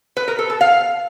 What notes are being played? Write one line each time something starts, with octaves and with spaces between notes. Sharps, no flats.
B4
A#4
A4
A4
F5